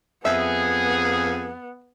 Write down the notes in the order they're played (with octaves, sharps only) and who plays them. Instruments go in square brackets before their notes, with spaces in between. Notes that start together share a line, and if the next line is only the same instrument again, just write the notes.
[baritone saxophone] F2 [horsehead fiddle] B3 [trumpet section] G#4 [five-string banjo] E5